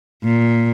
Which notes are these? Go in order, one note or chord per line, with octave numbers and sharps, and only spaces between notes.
A#2